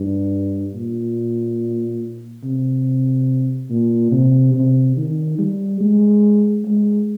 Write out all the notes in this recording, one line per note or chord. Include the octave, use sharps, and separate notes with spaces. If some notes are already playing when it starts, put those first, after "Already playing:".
Already playing: G2
A#2
C3
A#2
C3
C3
D#3
G3
G#3
G#3